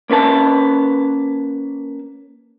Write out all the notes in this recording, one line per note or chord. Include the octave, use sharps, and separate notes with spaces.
A#3 C#4 B4 A5